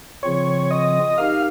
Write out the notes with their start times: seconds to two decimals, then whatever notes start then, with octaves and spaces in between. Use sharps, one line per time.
0.23 C#3 F3 C4 F4 C#5
0.71 D#5
1.18 D#4 G4 A#4 F5